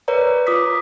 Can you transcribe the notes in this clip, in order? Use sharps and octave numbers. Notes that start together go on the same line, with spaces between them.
A#4 B4 C#5 D5 A#5
F4 D6 D#6 B6